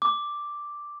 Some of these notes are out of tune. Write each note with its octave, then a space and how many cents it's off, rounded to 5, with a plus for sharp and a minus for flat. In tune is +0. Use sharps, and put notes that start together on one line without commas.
D6 +0